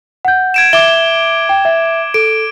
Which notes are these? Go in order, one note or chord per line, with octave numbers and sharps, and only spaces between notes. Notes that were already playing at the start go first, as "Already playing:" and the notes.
F#5 G6
G#6 D7 E7
E5 D6 G7
G5
E5
A4 D7